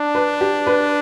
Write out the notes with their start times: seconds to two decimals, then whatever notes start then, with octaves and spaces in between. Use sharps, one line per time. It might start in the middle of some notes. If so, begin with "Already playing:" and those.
Already playing: D4
0.15 B4
0.41 G4
0.67 B4